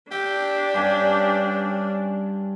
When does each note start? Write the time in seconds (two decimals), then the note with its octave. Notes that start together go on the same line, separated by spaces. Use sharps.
0.11 D4 G4 G5 E6 G6
0.74 G2 C#4 D5 G#5 A5